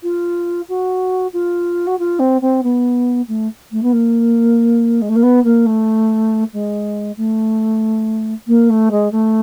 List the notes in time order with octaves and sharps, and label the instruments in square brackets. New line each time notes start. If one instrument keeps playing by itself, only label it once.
[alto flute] F4
F#4
F4
F#4
F4
C4
C4
B3
A3
A3
B3
A#3
G#3
A3
A#3
B3
A#3
A3
G#3
A3
A#3
A3
G#3
A3